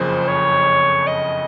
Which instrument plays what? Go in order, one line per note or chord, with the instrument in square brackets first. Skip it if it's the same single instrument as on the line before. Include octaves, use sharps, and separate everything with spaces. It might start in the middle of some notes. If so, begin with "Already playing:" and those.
Already playing: [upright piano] F#1 F2 C#3 F3 [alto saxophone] C5
[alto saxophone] C#5
D#5